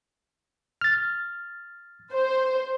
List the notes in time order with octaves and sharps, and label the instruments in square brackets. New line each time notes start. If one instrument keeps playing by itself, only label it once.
[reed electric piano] F6 A6
[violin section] C5